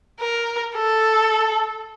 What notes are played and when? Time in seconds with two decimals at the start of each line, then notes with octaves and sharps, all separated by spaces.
0.20 A#4
0.76 A4